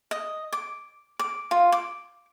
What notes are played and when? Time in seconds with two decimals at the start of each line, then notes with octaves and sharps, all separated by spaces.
0.11 D#5
0.52 D6
1.19 D6
1.51 F4
1.72 D6